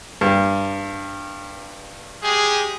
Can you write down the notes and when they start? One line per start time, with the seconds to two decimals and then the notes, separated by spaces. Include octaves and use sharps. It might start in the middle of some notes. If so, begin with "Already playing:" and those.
0.21 G2
2.23 G#3 G4 G#4